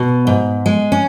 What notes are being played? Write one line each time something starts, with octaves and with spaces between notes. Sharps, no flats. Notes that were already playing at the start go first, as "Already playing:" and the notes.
Already playing: B2
G#2
G#3
C#4